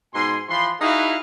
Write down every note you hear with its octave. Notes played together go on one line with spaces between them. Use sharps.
G#2 B2 G#5 C6
E3 F3 B5 C6
D#4 E4 F#4 G#4 B4 F5